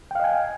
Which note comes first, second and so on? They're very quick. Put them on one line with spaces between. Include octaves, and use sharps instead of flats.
G5 F5 D#5 G#5